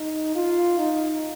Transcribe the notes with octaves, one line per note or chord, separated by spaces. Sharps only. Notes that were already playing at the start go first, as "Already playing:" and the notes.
Already playing: D#4
F4
D#4